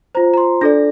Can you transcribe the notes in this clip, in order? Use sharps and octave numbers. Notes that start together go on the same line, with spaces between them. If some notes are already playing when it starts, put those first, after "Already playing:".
F4 C5 A#5
A#5
C6
D4 A4 D5 A#6